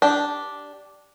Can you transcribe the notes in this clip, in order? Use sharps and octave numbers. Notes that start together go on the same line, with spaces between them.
D4 G4